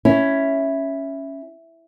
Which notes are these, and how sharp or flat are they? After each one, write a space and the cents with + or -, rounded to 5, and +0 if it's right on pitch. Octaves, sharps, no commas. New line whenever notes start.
C#4 +0 E4 +0